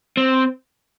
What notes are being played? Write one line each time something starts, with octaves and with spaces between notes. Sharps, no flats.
C4